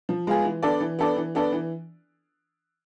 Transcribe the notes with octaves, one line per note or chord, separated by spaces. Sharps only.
F3
G#3 B3 F4 G#4
E3
B3 D4 A4 D5
E3
B3 D4 A4 D5
E3
B3 D4 A4 D5
E3